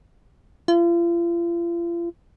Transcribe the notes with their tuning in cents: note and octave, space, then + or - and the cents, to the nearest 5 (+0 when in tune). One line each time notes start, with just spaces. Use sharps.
F4 -40